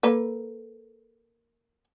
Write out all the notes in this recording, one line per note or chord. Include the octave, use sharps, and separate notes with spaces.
A#3 A4 B4